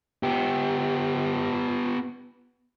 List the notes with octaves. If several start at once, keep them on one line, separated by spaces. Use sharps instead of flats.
B3 G4